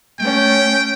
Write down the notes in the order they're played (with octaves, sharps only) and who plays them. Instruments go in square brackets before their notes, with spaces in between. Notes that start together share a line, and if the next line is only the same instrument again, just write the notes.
[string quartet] A3 C#4 [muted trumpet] G5